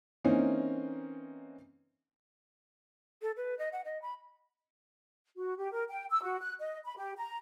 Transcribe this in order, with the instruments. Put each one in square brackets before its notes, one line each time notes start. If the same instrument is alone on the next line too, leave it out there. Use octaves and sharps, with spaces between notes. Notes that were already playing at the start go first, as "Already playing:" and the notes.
[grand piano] E3 A#3 C4 C#4 D#4
[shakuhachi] A4
B4
D#5
F#5
D#5
B5
[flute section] F#4
G4
A#4
G5
E6
F#4
F#6
D#5
B5
G4
A#5